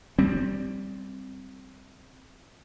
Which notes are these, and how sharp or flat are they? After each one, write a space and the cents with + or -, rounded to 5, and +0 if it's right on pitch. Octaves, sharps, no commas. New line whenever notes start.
G3 +0 C4 +0